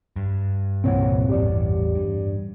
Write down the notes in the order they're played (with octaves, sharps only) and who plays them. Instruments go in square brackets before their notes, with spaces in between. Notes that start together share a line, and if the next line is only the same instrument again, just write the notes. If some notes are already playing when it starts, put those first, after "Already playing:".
[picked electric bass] G2
[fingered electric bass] C2 A#2 E3 [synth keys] C4 C#5 F#5
[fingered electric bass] A1 E2 [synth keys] G4 D5
[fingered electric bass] G2